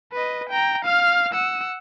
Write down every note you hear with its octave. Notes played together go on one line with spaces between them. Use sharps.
B4 D#5
G5 A#5
F5 F6
F#5 E6